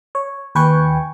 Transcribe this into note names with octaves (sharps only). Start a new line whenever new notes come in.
C#5
D#2 B4 G5 G#5 C#6